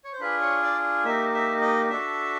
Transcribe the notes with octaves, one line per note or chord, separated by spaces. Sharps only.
C#5
C5
D4 F4 G#4 B4
C#5
D5
A#3 D#4 G4 E5
E5
D#5
D4 F#4 A4 E5